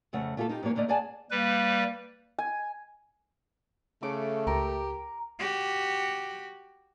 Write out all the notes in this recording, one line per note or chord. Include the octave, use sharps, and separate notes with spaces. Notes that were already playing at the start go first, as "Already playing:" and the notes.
F2 C#3 A3 F#5
A3 A#3 F4 G#4 A4
D#4 F4 G4
G#2 F3 A#3 C#5
G#2 D3 A3 A#3 D5 D#5
G#4 C#5 D5 F#5 G#5 A5
G3 A#3 B4
G#5
C#3 A3 D6
C#2 G4 A#4
F#4 G4